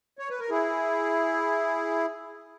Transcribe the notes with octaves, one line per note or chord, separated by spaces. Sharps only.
C#5
B4
A#4
E4 G#4